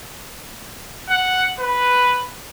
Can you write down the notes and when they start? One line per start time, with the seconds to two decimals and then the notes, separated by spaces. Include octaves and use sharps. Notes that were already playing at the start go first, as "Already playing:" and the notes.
1.10 F#5
1.60 B4